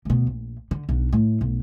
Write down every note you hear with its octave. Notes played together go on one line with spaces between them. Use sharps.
D2 B2
A#1
D3
B1 D4
A2
B1